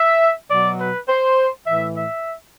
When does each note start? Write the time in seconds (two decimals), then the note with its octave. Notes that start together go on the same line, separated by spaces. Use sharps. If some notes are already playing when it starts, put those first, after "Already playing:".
Already playing: E5
0.50 B2 F#3 D5
0.79 B4
1.08 C5
1.65 A2 E3 E5
1.94 E5